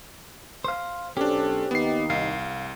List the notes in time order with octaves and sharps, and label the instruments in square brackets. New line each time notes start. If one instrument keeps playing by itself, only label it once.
[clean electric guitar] C5 F5
[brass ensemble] B1 A4 C5 [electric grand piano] C#4 D4 [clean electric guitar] G4
[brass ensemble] D#2 D#3 D#4 [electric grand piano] B3 C7
[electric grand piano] C2 [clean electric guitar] F5